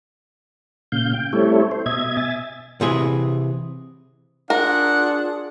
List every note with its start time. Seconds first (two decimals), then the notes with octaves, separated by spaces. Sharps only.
0.92 A#2 C#3 F5 G6
1.14 G5
1.33 G3 A3 C4 E4 A4 C#5
1.71 C5
1.86 B2 D#5 E5 G#6
2.17 E5 G#5 A6
2.81 C3 E3 G#4
4.50 D4 F4 G#4 A#4 F#5